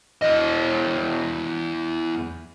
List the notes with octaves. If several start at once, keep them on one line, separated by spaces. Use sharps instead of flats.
E2 D#5